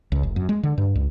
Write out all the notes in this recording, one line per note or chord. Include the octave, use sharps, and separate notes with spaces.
C#2
F1
F#2
G#3
D3
G2
C#2